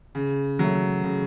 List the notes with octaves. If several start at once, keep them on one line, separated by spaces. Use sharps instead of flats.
C#3
F#3 A3
C#3